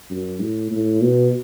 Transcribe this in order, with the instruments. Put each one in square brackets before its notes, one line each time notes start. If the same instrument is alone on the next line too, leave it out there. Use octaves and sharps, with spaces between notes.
[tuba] F#2
A2
A2
B2